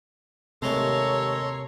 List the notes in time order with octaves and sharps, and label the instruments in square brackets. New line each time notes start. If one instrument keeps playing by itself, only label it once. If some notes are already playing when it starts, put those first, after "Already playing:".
[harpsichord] D#2 G#3 A3 [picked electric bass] C3 [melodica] A4 A#5 C6 [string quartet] C#5